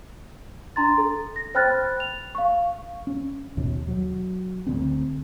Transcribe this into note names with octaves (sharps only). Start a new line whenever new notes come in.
D4 A#5 C6 A6
A4
A#6
C5 G5 B5 F6 F#6 A6
F7
F5 C#6
C#4
D#2 B2
F#3
D2 D3 B3 C4